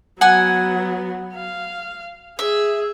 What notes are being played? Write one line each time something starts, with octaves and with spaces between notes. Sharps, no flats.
F#3 B3 F#5 G#5
F5
G#4 E5